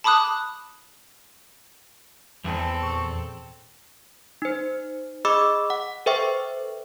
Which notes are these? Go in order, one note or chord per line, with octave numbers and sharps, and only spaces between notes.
A5 B5 D6 D#6 F#6
E2 C4 A4
A#2 G#4 C#6
D#4 C5
G#4 D#5 B5 D6 E6
F#5
A4 B4 C5 E5 G5 C#6